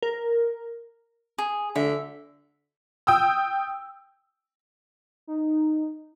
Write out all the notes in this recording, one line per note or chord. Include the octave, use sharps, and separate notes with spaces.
A#4
G#4
D3 E5
G5 D#6 E6
D#4